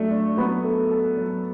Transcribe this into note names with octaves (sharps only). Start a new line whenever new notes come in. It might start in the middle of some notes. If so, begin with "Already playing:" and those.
Already playing: F#3 A3 D4 A4
D4
F#3 B3
A3
A4
F#3